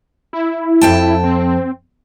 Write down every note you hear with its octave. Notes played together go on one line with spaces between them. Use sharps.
E4
F2 G5 A5
C4